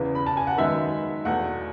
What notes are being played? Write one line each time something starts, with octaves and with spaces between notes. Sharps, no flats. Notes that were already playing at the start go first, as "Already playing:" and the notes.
Already playing: E2 C#3 E3 B3
B5
A5
G#5
F#5
F#2 D#3 G#3 B3 E5
E2 B2 A3 F#5